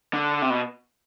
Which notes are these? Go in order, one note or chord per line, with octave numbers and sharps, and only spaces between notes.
D3
C3
B2